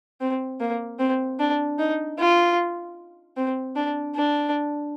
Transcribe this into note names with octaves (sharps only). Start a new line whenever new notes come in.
C4
A#3
C4
D4
D#4
F4
C4
D4
D4